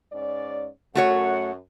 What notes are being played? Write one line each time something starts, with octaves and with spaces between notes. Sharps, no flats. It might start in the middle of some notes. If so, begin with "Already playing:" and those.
G#2 C#4 D5
F#2 A3 F#4 C#5 F#5